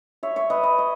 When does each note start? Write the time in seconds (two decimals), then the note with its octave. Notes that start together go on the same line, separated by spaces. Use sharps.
0.23 C#5 E5
0.36 C#5 E5
0.50 B4 D#5
0.63 B4 D#5
0.79 D#5